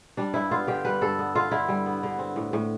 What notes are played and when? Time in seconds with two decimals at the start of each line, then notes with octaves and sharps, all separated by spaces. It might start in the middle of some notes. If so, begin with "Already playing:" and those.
0.17 G3 D4
0.34 G2 E4
0.51 B3 F4
0.67 D3 G4
0.85 G3 B4
1.01 G2 A4
1.19 B3
1.35 D3 F4
1.51 D3 E4
1.68 G3
1.86 B3
2.03 D3
2.19 C4
2.36 A2
2.53 A2